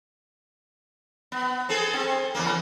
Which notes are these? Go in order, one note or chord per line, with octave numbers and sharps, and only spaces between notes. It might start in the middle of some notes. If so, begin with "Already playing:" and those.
B3
C4 G#4 A4
C4
E2 C#3 A#3